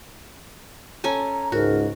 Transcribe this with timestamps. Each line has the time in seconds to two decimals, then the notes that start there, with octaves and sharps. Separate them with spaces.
1.04 C#4 A4 G#5 A#5
1.52 C#2 G#2 F#4 A#4